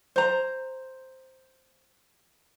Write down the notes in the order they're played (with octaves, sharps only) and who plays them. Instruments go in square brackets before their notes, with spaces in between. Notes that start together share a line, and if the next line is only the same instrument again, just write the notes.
[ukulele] C5 A#5